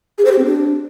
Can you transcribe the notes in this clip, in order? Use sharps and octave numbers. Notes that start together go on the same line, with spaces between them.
G#4
C5
G4
C4
D4